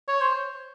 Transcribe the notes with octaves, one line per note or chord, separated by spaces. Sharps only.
C#5
C5